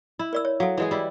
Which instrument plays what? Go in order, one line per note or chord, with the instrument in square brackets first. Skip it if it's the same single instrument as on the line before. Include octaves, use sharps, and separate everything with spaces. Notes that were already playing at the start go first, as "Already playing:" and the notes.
[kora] E4
[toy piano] A#4 D5 E6
C#5
[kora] F#3 [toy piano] A4 F5
[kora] E3 G#3 G#4
G3 E4